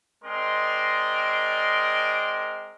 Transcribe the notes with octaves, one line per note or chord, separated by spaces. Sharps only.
G#3 C4 A#4 D5 D#5 C6